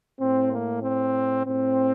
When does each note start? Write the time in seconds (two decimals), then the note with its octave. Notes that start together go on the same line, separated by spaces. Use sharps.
0.20 A2 C4
0.51 A#3
0.83 C4
1.46 A2 C4